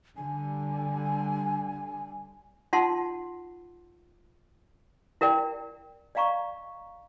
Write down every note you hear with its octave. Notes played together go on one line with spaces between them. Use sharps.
D3 G3 G#5
D#4 F4 F#5 A5 C6
E4 A#4 D5 G5
D5 D#5 F5 A#5 C#6